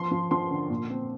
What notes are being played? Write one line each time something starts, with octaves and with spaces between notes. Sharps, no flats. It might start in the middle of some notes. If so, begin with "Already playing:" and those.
Already playing: F3 C6
F3
F3 C6
D3
A#2
C4